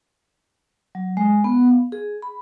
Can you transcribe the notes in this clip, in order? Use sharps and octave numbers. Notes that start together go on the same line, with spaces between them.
F#3
G#3
B3
F5
G#4
B5